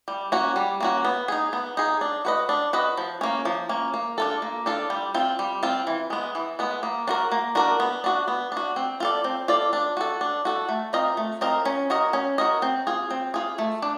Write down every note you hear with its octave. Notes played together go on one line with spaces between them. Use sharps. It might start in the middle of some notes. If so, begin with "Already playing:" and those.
G3
A#3 C#4 F#4
G3
A#3 C#4 F#4
B3
D#4 G#4
B3
D#4 G#4
D4
F#4 B4 D#5
D4
F#4 B4 D#5
F3
A#3 C#4
F3
A#3 C#4
A#3
D4 F4 A4
A#3
D4 F4 A4
G3
C4 F4
G3
C4 F4
E3
G#3 B3
E3
G#3 B3
A#3
D4 F#4 A#4
A#3
D4 F#4 A#4
B3
D4 F#4
B3
D4 F#4
C4
F4 A4 D5
C4
F4 A4 D5
D4
F#4 A4
D4
F#4 A4
A3
C4 F4 A#4 D#5
A3
C4 F4 A#4 D#5
C#4
F#4 A#4 D#5
C#4
F#4 A#4 D#5
C4
F4 G#4
C4
F4 G#4
A3
D4